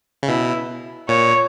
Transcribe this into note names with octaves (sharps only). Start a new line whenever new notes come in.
C#3
B2 E4
A#2 C#5